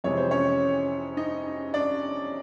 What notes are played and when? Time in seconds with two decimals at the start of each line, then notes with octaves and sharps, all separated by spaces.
0.04 F2 C3 E3 G#3 C#5
0.17 C5
0.31 C#4 C#5
1.17 D#4 D#5
1.74 D4 D5